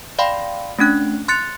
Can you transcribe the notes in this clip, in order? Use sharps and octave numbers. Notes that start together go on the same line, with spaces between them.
D5 F5 G5 B5 C6
A3 C#4 D4 F#6
C6 F#6 A6 C#7